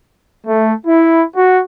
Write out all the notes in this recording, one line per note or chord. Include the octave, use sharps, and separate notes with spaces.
A3
E4
F#4